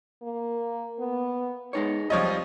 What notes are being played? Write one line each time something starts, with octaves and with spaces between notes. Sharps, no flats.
A#3
B3
G#3 B3 D#4 C#5
F3 G3 C4 F4 C#5 D#5